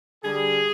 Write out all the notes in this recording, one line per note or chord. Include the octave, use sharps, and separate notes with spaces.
D3 G3 G#4